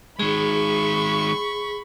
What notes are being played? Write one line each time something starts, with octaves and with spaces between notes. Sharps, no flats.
D#3 G#3 G#4 B5 C#6